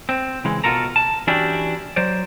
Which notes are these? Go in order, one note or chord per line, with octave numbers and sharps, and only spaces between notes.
C4
C#3 E3 G#3
B2 F4 F#4 A4 A#4 A#5
A5
E3 C#4 D4 E4 F#4 G4
F#3 C5 D5